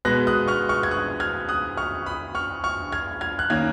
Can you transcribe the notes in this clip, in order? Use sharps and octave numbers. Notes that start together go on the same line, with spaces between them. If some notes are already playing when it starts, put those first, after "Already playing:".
B2 G#3 B3 F#6 A#6
D#6 F#6
C#6 F6
C#6 F6
G#6
D#6 F#6
F6 G#6
D#6 F#6
C#6 F6
B5 D#6
C#6 F6
C#6 F6
F6 G#6
F6 G#6
F#6
D#3 A#3 C#4 F6 G#6